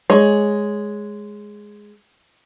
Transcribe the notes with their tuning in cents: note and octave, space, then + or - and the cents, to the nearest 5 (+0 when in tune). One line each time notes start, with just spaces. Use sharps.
G#3 +0 C#5 +0